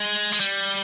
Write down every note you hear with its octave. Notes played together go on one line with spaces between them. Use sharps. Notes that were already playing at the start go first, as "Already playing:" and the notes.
Already playing: G#3
G#3
G3